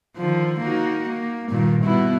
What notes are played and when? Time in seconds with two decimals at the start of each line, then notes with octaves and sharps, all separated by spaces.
0.17 D3 D#3 F3
0.60 A#3 D#4 F#4
1.09 A#3
1.50 G2 A#2 D#3
1.84 B2 B3 E4